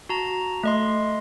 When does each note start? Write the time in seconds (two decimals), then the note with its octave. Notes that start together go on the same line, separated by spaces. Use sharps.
0.09 F#4 A5 A#5
0.64 A3 D#5 C6